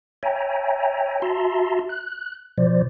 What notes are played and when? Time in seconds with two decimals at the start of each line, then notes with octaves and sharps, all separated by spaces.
0.23 C#5 E5 G5 G#5 A#5
1.22 F#4 E5 A5 A#5 C6
1.89 F#6
2.58 B2 F3 C5 D5